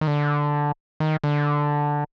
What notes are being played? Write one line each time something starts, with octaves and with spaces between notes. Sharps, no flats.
D#3
D3
D#3
D3